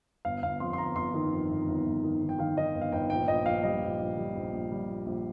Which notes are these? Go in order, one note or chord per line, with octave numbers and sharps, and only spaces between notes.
G1 F5
G1 F5
F2 C6
C6
G1 A#5
G1 C6
D#3
F2
G1
G1
G1
D#3
D#3
G5
D#3 F5
D#3 D#5
G1
F5
G1 G5
A#1 G5
A#1 D#5
A#1 F5
G3 D#5
A#1
A#1
G3
A#1
A#1
G3
A#2
A#1